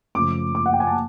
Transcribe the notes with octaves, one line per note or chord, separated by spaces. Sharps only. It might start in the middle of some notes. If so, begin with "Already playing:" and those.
F#2 C#3 F3 A3 D6
D6
F#5
G5
G#5
A5